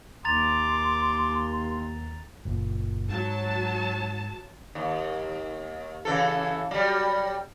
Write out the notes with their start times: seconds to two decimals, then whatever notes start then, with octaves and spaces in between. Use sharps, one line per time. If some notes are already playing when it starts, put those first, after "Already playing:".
0.25 D#2 A#5 C6 D6 A6 F7
2.45 F#1 A#2
3.09 G#2 F#3 A5
4.75 D#2
6.05 C#3 E3 A4
6.71 F#3 G3